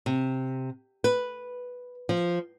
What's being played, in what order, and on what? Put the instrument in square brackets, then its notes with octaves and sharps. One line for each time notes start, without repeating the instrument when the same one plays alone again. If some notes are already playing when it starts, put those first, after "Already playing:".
[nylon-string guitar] C3
B4
F3